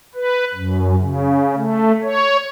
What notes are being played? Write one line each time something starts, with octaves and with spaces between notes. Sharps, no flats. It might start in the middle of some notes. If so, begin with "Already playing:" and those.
B4
F#2
C#3
A3
C#5